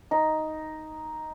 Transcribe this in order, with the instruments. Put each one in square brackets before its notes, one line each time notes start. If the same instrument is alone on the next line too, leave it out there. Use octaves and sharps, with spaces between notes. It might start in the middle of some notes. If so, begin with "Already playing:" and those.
[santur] D#4